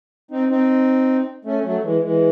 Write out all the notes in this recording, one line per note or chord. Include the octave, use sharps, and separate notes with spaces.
C4 D#4
C4 D#4
A3 C#4
F#3 A3
E3 G#3
E3 G#3